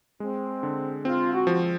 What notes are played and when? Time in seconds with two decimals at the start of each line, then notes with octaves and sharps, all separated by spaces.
0.20 G#3 C4
0.63 D3
1.05 C4 F4
1.33 F#4
1.47 F3